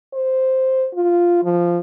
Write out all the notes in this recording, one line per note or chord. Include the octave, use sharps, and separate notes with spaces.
C5
F4
F3